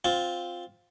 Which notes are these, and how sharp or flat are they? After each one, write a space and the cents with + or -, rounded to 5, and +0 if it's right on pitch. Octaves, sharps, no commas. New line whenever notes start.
C4 +0 F4 +15